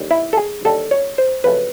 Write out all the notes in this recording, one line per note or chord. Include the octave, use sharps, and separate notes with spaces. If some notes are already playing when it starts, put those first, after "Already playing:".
Already playing: D#2 D3 G3
E4
A4
G#4
D#2 D3 G3 A4
C#5
C5
F2 C#3 F#3 A3 B4